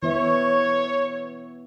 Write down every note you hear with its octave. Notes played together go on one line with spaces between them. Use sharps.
E3 B3 C#5 E5